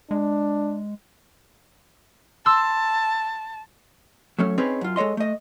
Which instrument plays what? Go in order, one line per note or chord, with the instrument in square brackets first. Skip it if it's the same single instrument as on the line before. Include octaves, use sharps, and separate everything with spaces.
[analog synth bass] G#3 [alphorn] D4
[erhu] A5 [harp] C6 E6
[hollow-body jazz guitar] F#3 A3 C#4
C4 C#4 D#4 G#4 B4
F#2 F4
G#3 A4 C#5 D#5 C6
A3 D#5